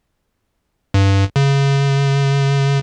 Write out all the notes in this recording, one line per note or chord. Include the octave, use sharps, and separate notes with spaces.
G2
C#3